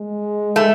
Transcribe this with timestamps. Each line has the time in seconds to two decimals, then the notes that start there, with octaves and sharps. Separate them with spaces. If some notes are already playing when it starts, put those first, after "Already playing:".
Already playing: G#3
0.56 A3